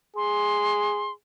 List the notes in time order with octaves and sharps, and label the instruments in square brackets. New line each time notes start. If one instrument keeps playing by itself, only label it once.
[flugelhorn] G#4 [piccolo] C6